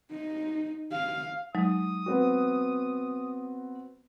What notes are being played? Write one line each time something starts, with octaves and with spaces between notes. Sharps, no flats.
D#4
F5
F#3 G#3 D#4 D#6
B3 C4 F#4